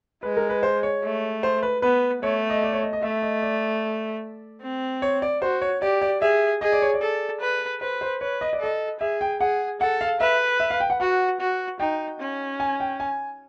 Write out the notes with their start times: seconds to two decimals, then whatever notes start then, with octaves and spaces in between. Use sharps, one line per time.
0.23 G#3 B4
0.37 A#4
0.50 B4
0.63 C5
0.83 C#5
1.03 A3
1.43 C5
1.63 B4
1.82 B3 B4
2.23 A3 C#5
2.50 D#5
2.63 D5
2.73 C#5
2.83 D#5
2.93 D#5
3.02 A3 E5
3.23 D#5
3.42 D5
4.62 C4
5.02 C#5
5.22 D5
5.42 F#4 C5
5.62 C#5
5.82 G4 D5
6.02 D5
6.21 G#4 E5
6.61 G#4 D#5
6.72 D5
6.82 C#5
6.94 D5
7.02 A4
7.41 B4
7.81 B4 C5
8.01 C5
8.21 B4 C#5
8.41 D#5
8.53 D5
8.61 A4 D#5
9.00 G#4 E5
9.21 G5
9.41 G#4 F#5
9.81 A4 F#5
10.01 F5
10.20 B4 E5
10.60 E5
10.71 F5
10.80 G5
10.90 F#5
11.00 F#4 F#5
11.40 F#4
11.80 D#4 G5
12.20 C#4
12.60 G#5
12.80 G5
13.00 G#5